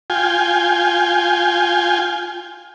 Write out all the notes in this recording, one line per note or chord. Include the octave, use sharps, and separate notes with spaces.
F4 G5 G#5